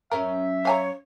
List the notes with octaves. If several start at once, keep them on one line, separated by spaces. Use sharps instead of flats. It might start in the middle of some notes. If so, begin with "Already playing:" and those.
F#2 C#4 A#4 E5
C#5 F5 G#5 A#5